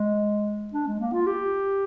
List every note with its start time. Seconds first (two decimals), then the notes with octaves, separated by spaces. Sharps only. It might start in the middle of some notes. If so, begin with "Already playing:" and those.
Already playing: G#3
0.73 D4
0.87 G#3
1.00 A#3
1.13 F4
1.26 G4